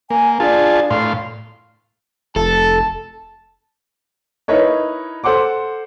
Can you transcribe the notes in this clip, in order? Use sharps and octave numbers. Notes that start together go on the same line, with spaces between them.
A#3 G#5
D4 F4 G#4 A5
A2 F5 C6
F1 A4 A5
D#4 E4 A#4 B4 C#5 D#5
A4 C5 F#5 C6 D6